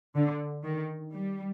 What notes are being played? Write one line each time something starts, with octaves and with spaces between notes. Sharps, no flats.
D3
D#3
G3